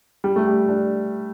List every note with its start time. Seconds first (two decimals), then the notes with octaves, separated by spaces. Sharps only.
0.24 G3
0.36 A3
0.47 G3
0.69 D4